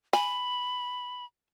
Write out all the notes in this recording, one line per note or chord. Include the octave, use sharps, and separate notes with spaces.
G#5 B5